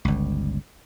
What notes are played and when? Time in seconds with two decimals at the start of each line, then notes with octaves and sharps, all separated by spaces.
0.05 G1 C#2